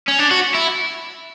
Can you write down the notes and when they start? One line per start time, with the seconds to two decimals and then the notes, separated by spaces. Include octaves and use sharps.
0.08 C#4
0.19 D4
0.31 F#4
0.54 E4